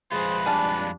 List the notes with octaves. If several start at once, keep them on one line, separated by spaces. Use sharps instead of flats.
F2 G#3 F4 G#4 B4 C5
G3 D4 G#4 F5 A5